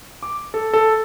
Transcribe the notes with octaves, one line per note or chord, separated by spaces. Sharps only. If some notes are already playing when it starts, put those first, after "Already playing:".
D6
A4
A4